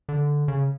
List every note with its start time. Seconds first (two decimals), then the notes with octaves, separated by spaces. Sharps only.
0.09 D3
0.48 C#3